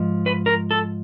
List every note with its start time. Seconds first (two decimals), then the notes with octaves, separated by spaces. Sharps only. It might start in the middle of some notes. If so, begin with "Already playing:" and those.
Already playing: G#2 F3
0.26 B4
0.46 A#4
0.71 A4